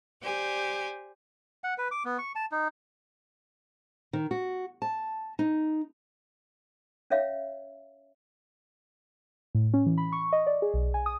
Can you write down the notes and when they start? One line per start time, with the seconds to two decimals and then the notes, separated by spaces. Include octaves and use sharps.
0.22 G4 C5 D5 G#5
1.64 F#5
1.78 B4
1.91 D6
2.05 B3
2.18 C#6
2.36 A5
2.52 D#4
4.13 D#3
4.31 F#4
4.82 A5
5.39 D#4
7.10 C#4 C#5 E5 F5
9.55 A2
9.74 C#4
9.86 E3
9.98 B5
10.12 C#6
10.33 D#5
10.47 D5
10.62 G#4
10.74 B1
10.94 G#5
11.06 D#6